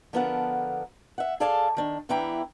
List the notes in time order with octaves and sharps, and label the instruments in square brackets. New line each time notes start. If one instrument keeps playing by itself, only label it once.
[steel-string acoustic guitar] D3 F3 B3 A4 A#4 F#5
E5 F#5
G#4 A4 D5 F5 G#5 A5
D#3 D4
E2 E3 D4 E4 G5 A#5